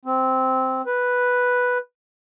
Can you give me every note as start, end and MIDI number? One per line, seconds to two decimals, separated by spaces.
0.05 0.82 60
0.86 1.78 71